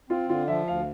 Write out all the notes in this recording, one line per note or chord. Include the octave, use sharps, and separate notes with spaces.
C4 F4
D3 F4
F3 E5
D2 F5